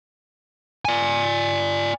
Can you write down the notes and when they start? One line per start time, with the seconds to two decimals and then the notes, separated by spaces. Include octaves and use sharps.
0.85 D5 G#5